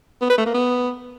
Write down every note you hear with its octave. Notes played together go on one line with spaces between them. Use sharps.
B3
B4
A3
A#3
B3